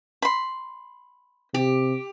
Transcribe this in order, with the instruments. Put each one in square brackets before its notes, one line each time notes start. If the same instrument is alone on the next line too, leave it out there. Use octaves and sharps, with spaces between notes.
[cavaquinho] B5 C6
[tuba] C3 [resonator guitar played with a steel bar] G4